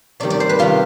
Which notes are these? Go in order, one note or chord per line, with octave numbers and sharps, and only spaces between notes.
C3 D#3 G3 D5
D5
C5
B4
C3 D#3 G3 F4